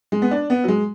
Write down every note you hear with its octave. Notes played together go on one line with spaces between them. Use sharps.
G#3
B3
D4
B3
F#3
G#3